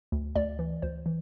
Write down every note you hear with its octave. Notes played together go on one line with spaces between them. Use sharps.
D2
D2 D5
E3
D2 C5
E3